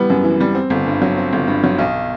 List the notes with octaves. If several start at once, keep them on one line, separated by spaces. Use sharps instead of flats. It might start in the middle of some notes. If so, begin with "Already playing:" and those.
Already playing: E3 G3 B3
F#2
E3
G3
C4
G1
G2
F#3
C4
G1
G2
F#3
B1